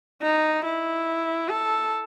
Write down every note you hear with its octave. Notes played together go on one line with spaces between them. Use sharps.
D#4
E4
A4